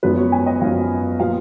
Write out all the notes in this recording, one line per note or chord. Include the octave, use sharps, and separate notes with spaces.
G#1 F#2 F3 B3 B4
C#5
G#5
D#5
G#1 F#2 F3 B3 F5
A#2 F3 B3 F5